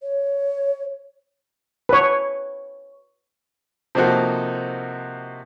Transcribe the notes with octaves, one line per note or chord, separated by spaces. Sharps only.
C#5
B4 C#5
C3 F3 A#3 D#4 F#4 A4